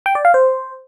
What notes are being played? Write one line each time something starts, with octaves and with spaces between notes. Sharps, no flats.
G5
D5
F5
C5